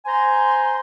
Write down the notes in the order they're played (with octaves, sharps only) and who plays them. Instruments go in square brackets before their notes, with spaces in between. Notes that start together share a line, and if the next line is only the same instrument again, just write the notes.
[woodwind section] C5 G#5 A#5 C6